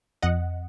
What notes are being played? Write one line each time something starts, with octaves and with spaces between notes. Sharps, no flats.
F2 D#5 F#5